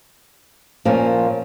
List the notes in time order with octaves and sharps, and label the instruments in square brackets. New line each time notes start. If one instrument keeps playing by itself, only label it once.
[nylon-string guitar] A#2 F3 A#3 C#4